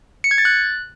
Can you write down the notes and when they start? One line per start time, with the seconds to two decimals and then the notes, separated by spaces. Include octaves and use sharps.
0.24 C#7
0.31 G#6
0.38 A6
0.45 F#6